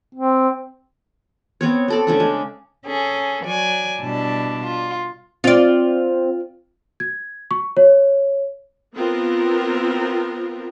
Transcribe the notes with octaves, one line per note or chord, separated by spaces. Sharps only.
C4
B3 C4 C#5
C4 A4 D5
C#3 A3 D4
G#3
C#4 G#4 A4
F#3 D5 G#5
B2 G3 D4 E4 A5
F4
C4 F4 D5
G#6
C#6
C#5
B3 C4 F4 A#4